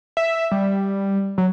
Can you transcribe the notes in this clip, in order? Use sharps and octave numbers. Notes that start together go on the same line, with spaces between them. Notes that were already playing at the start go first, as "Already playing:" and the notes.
E5
G3
F#3